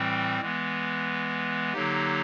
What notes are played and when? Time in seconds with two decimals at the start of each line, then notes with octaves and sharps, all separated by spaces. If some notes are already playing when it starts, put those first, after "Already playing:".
Already playing: A2 E3 G3 C4
0.40 E3 G#3 B3
1.73 D3 F#3 A#3 D#4 G4